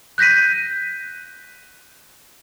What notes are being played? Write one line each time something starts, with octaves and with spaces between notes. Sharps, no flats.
F#6 G6 A#6 B6 D#7